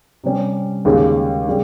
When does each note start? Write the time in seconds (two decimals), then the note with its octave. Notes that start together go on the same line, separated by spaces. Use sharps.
0.24 C3 G3 C#4
0.85 D#2 C#3 G#3 C#4 G4
1.48 C#3 G3